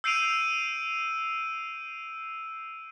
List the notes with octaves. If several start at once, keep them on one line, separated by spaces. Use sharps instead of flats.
E6 G6 C7 D7 D#7 F7